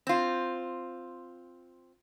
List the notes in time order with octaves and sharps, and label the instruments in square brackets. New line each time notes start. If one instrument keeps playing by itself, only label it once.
[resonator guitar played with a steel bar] C4 F4